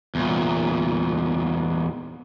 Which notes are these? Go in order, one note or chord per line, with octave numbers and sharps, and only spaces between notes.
E2 A#2